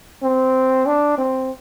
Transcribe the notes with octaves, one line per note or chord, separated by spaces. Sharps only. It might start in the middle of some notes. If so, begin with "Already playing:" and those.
C4
D4
C4